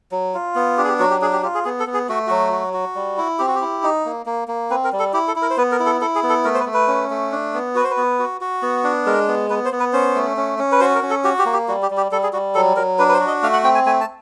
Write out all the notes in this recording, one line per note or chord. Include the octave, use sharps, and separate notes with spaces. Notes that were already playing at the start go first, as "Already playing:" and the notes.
F#3
F4
B3
D4 G4
G#4
G4
F#3 F#4
G4
D4 G#4
G4
F4 G4
G#4
B3 G#4
A4
B3
G#4
A3 F#4
F#3 F#4
F#4
F#4
G3
E4
C4 G4
F#4
G4
E4
D#4
A#3
A#3
A#3
C4 B4
A#4
G3
A4
E4 G4
A4
E4
A#4
C5
B3 B4
A#4
E4
A4
E4 A4
G#4
B3
A4
A3 A#4
C5
B4
A3
B4
C#4
A3
D4
B3
F#4 B4
C5
B4
B3
F#4
F#4
B3
D4
G#3 A#4
B3
B3 B4
C5
B3
B4
C#4 C5
A3
C#4
C#4
B4
F#4 C5
A#4
C#4
A4
F#4 G4
G4
A#3
G4
G3 F#4
G4
G3
G4
G3 A4
G#4
G3 F#4
F#3 A4
F#3 A#4
D4 B4
B4
C5
F#4
D#5
A3 F5
F#5
C4 G5
G#5
A3 G#5
A5